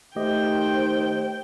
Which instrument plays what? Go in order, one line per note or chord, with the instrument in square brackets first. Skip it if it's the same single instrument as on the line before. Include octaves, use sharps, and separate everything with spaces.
[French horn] D#3 [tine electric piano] A3 G4 D#5 [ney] C5 [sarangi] G5